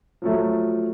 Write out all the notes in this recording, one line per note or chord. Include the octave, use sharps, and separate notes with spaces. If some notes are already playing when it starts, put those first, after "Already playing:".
F3 F#3 A3